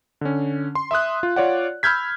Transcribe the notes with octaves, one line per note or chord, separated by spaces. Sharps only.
D3 C#4
C6
E5 C6 D#6 F#6
F4
F4 C#5 D5 F#5
B5 E6 F6 G6 G#6 B6